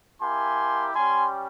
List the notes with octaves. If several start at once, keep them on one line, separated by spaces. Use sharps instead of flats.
A#3 E4 G4 G#5 C6
G3 C#4 G4 G#5 C6